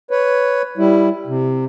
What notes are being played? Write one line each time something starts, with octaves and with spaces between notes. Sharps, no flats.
B4 C#5
G3 E4
C3